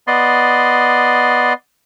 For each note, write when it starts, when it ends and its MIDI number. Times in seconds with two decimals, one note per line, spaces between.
0.07 1.53 59
0.07 1.53 74
0.07 1.53 75
0.07 1.53 84